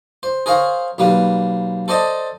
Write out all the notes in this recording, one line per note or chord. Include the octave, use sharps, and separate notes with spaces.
C5
G#4 A#4 C5 C#5 F5
B1 G3 A#3 B4
A4 C5 D5 D#5 A5